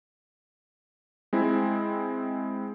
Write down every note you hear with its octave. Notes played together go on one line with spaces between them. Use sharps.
G#3 C4 E4